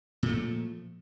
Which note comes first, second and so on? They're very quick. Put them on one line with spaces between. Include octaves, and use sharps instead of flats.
A#2 A3 F3